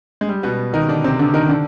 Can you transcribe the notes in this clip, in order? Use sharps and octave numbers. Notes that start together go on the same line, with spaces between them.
G#3
G3
B2 B3
D#3 D#4
D3 D4
C3 C4
D3 D4
D#3 D#4
D3 D4